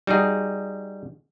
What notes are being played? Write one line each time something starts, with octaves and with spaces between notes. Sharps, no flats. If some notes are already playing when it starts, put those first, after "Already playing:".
G3 D#4 F#4 G#4